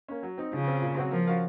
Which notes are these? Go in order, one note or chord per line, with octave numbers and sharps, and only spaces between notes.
A#3 C#4
F#3
C4 D#4
C#3 F3
C4 F4
A#2
F#3 C4 F#4 C5
F3 A#3
C#4 F#4 A#4 F5